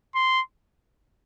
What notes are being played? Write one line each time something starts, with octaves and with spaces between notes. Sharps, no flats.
C6